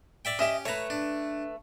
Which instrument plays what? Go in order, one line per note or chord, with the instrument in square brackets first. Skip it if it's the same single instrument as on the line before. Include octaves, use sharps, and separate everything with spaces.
[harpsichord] D5 E5 G5
[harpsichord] C#4 G4 [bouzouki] D#5 E5
[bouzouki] A3 B4 [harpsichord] C#5 A#5
[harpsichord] D4